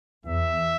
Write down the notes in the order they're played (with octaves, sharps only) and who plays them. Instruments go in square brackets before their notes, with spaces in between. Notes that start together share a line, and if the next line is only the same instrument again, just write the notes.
[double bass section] E2 [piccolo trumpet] E5